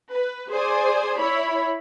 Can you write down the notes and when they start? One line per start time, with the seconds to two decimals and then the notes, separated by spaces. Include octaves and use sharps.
0.10 B4
0.51 G#4 C5 D5 G#5
1.19 E4 C#5 B5